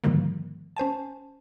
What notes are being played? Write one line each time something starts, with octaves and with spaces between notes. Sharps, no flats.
G#2 D3 D#3 F3 G3 A#3
C#4 C5 G#5 A5